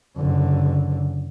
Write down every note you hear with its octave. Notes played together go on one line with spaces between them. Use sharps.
F#1 D3